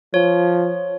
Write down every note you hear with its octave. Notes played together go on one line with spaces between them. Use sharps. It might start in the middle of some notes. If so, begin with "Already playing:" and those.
F3 C#5